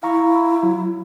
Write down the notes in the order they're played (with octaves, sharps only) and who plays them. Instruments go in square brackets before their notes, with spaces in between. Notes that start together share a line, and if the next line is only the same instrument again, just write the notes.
[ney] E4 [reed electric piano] F5 A#5 C#6
[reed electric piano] F#3